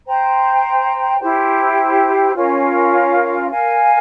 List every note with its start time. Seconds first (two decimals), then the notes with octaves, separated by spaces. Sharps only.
0.06 C5 G5 A#5
1.20 E4 G4 C5
2.35 C#4 F4 A#4 F5
3.50 A#4 F5 G#5